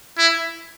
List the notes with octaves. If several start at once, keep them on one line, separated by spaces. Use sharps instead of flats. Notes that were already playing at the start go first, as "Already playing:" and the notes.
E4